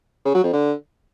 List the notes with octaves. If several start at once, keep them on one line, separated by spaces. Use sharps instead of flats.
C#3
F#3
F2
D3